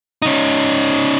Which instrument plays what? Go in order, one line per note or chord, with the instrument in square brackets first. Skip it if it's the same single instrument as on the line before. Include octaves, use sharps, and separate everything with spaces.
[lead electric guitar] C#4 D#4